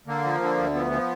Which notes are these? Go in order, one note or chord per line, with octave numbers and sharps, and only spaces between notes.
D3 A#3
F3
D3
D2
F3 B3
F3